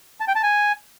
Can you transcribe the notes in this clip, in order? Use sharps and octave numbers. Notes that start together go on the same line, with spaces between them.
A5
G5
A5
G#5